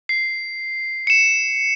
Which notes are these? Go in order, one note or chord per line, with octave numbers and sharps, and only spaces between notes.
C7
C#7 E7